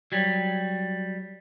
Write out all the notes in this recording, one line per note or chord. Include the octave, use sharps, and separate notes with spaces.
F#3 G3